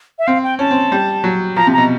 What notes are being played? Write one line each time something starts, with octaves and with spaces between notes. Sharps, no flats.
E5
C4 F5
G5
C#4 A5
C4
G3
F#3
F3 A#5
C3
B2 A#5